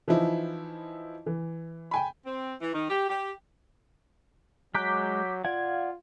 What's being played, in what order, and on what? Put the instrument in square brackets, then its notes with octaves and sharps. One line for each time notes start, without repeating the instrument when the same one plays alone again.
[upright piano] E3 F3 D#4 E4
E3
G5 G#5 B5
[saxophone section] C4
E3
D#3
G4
G4
[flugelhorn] F#3 [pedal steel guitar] G#3 A#5 F#6 [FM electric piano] D6 G6 B6
[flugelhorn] F4 [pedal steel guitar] D5 F5 F#5 [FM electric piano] G#6